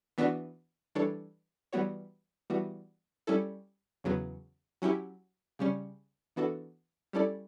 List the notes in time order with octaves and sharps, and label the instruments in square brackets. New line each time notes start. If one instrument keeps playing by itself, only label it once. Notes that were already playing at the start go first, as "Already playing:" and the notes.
[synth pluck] E3 B3 D4 F#4
E3 G3 D4 A4 C#5
E3 G3 B3 F#4 C#5
E3 G3 B3 F#4
G3 C#4 E4 A4
E2 C#3 F#3 B3
F#3 C#4 E4 G4
C#3 G3 C#4
E3 B3 D4 F#4 A4
G3 C#4 E4 A4 D5